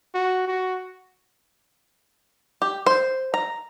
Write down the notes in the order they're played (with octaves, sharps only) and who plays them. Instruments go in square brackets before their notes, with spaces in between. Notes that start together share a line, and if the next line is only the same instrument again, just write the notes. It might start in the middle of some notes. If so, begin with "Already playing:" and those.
[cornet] F#4
F#4
[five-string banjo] G4
C5
A#5